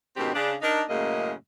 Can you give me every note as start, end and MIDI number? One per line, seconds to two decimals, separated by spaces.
0.17 0.30 44
0.17 0.30 47
0.17 0.30 51
0.17 0.30 60
0.17 0.30 61
0.17 0.30 67
0.34 0.54 49
0.34 0.54 62
0.62 0.82 62
0.62 0.82 63
0.62 0.82 70
0.89 1.33 42
0.89 1.33 45
0.89 1.33 49
0.89 1.33 56
0.89 1.33 58
0.89 1.33 75